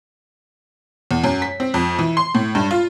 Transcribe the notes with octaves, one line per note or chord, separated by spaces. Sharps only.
E2
F#2
B6
C4
F2
E3
C6
A2
G2
F4